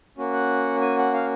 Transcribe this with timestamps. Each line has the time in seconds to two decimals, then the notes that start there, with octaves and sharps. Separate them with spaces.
0.17 A#3 C#4 F#4
0.33 F#5
0.81 G#5
0.98 F#5
1.13 F5